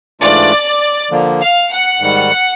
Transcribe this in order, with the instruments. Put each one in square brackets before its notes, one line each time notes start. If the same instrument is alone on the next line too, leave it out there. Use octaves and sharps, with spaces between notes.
[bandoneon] G#2 E3 A3 D4 F4 [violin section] D5
[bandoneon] D3 F3 A#3
[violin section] F5
F#5
[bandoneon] G#2 D#3 G3